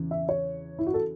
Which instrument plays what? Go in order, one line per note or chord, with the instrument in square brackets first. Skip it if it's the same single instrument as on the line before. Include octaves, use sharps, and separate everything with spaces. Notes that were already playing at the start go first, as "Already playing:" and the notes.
Already playing: [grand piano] E2 C#3 E3
[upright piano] E5
C#5
E4
F#4
A4